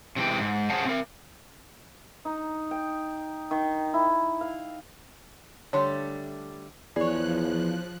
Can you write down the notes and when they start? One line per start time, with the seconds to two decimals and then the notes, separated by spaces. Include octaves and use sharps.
0.16 C3 E3 G#3 G5
0.40 G#2
0.70 G#4 C5 C#5 F5 F#5 A5
0.85 C4 A#4
2.25 D#4
2.71 G5
3.51 D#3
3.94 E4
4.41 F5
5.73 D3 G3 A3 C#5 C6
6.96 E2 F3 G#4 C#5 D5 F#6